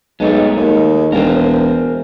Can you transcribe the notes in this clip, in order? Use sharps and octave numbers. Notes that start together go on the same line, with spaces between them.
B1 G#3 A3 D#4
D#2
E1 A#4 C5